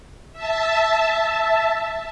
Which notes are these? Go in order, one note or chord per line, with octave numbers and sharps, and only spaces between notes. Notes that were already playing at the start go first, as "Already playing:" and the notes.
E5 A5